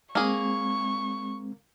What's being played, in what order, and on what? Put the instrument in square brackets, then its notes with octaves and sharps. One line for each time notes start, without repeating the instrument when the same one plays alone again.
[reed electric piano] G#3 C4 [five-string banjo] A#3 G#4 [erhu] C#6